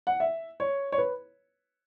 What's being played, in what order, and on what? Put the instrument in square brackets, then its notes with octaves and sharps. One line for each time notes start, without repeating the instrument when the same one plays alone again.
[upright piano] F#5
E5
C#5
C#5
B4